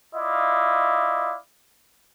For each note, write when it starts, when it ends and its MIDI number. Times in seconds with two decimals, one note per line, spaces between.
0.15 1.36 64
0.15 1.36 65
0.15 1.36 74
0.15 1.36 75
0.15 1.36 77